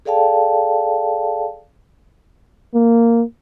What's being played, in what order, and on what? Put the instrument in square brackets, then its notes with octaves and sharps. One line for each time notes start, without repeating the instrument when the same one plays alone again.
[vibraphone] G#4 A4 D5 F5 G5 A5
[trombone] A#3